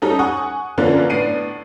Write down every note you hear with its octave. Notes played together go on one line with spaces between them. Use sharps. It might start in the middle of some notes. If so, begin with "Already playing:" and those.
G3 C#4 D#4 A4
F#5 G#5 C#6 D#6
D3 E3 F3 A#3 C#4 D4
A2 B3 D4 C7 D7 D#7